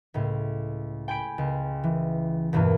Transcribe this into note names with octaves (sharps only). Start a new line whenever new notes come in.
C#2 A2
G5 G#5 B5 D7
C#2
E3
E2 G2 B2 E3 A#3